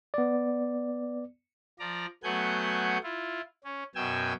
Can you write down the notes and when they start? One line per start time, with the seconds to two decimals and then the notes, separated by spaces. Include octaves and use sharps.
0.14 B3 D5
1.79 F3 D5 A#5
2.24 F#3 A3 B3 F#5 G#5 G6
3.03 E4 F4
3.64 C#4
3.95 F#2 B2 G5 G#5 E6